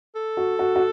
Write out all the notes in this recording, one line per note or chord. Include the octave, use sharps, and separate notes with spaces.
A4
F#4
F#4
F#4